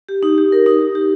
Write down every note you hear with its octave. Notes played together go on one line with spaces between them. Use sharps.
G4
D#4
G4
A#4
D#4
G4
G4